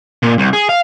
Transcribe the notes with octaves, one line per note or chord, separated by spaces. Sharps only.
A#2
C2
G#4
F5